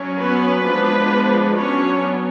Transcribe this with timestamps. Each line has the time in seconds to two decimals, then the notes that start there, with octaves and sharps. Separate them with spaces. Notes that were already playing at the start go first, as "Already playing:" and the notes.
Already playing: F#3 C#4
0.19 B3 B4
0.64 F3 G#3 B3 D4
1.56 F#3 B3 C#4 D4 C#5